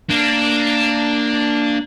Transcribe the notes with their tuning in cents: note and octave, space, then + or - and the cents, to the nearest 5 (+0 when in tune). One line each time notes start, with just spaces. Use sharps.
A#3 -10 D4 +0